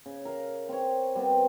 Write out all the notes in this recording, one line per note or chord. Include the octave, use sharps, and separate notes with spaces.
C#3
A#4 F5
C4 C#5
G3 B3 C4